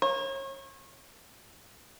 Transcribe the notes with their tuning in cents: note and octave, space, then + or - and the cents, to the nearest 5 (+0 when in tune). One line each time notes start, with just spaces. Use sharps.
C#5 -35